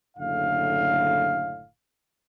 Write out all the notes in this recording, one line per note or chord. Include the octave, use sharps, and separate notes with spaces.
F#1 A2 D3 F5